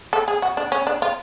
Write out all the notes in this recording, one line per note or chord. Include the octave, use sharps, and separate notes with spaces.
A4
G#4
F#4
D4
C#4
D4
F4